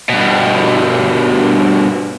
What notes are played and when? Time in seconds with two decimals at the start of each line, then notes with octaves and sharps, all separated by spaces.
0.09 G2 B2